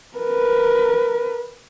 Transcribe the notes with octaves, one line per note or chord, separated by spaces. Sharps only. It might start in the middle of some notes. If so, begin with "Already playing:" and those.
A#4 B4